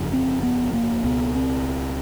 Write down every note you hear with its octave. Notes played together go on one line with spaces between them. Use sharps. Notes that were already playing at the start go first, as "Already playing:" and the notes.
Already playing: G1 F2 C#3
C4
B3
A#3
C#2 B2 B3
C4